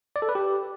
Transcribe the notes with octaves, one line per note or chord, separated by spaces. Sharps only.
D5
A4
B4
G4